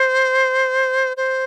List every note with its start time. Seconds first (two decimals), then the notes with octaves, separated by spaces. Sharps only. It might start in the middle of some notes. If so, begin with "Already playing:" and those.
Already playing: C5
1.17 C5